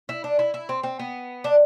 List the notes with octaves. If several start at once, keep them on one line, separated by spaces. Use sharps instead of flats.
E4
D4
E4
E4
C4
C4
B3
D4